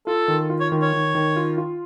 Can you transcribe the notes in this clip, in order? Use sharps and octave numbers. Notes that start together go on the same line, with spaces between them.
F4 A4
D#3
F4
C#5
D#3
C#5
D#3
D#3
F4
F4